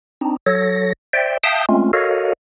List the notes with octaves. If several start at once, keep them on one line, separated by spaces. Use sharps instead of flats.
C4 D4 D#4
F#3 A4 C#5 A#6
C5 D5 E5 G5
E5 F5 G5 A5 D#6 G6
G#3 A3 C4 C#4 F4
F#4 A4 A#4 C#5 D#5 F5